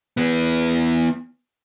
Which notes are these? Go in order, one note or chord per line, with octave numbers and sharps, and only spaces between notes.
E3 B3